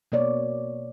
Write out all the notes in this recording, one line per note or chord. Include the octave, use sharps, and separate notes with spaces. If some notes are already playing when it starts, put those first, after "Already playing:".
B2 A#3 C#5 D5